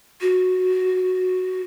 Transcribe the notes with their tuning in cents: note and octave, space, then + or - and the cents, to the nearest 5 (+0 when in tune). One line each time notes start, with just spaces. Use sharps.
F#4 -5